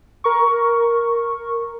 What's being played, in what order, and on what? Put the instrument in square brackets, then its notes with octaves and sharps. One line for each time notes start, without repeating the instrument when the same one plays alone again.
[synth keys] A#4 C#6